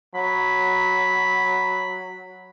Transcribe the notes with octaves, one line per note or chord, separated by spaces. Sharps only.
F#3 B5